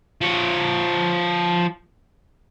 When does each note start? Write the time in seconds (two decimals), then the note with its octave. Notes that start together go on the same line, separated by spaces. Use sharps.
0.21 F3 C#5